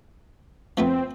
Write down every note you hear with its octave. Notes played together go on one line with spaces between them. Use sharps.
F3 A3 B3 C4